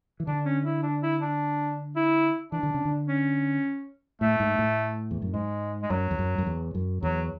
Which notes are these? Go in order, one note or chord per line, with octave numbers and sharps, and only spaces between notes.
E3
D3 D4
C#4
E4
D4
E4
D4
E4
E3 D4
D3
C#3
D3
C#4
A2 A3
G#2
A2
E2
F#2
G#2 G#3
G#3
F#2 F#3
E2
F#2
F#2
E2
F#2
E2 F#3